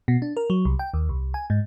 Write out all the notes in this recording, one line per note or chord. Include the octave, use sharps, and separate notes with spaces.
B2
D4
A#4
F#3
C2
G5
D#2
C2
G#5
G#2